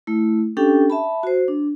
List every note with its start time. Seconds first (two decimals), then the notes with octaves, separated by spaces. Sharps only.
0.07 A3 E4
0.57 C#4 D4 G4 A4 G5
0.90 E5 A5 B5
1.23 F#4 C5
1.48 D4